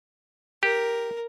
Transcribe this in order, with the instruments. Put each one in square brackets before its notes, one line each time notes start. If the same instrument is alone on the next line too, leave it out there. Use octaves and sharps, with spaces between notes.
[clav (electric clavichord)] G4 [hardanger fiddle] A#4